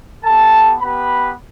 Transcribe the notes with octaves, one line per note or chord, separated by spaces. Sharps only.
B3 G4 A4 A5
B3 G4 B4 B5